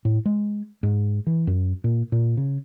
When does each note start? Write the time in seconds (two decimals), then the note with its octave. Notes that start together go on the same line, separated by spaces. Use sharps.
0.05 A2
0.26 G#3
0.83 G#2
1.27 E3
1.47 F#2
1.84 A#2
2.12 A#2
2.37 C#3